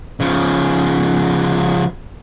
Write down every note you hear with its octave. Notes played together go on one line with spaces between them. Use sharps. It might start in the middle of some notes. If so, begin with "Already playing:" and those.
C#3 F3